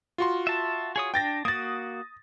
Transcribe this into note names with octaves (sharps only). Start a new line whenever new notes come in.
F4 F#4 C6
E5 A5
G#4 C#5 D#6
D4 G5 A6 A#6
A#3 F#4 D#6 A6